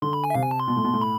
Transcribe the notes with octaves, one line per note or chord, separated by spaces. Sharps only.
D3 C6
B5
G#5
E5
C3 F5
G#5
A5
C6
B2
A2
B2
A2
B5